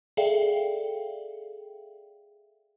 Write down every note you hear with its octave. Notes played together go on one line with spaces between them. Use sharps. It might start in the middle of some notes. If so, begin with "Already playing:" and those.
G#4 A4 D5 E5 F5 G5